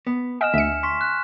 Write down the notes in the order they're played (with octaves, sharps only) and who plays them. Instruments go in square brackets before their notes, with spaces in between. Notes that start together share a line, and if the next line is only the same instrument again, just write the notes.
[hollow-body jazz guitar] B3
[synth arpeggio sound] D#5 F#5 [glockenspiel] G#5 F6 E7
[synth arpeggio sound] D2 C#7 [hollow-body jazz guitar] E5
[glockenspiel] C6 C#6 B6
F#6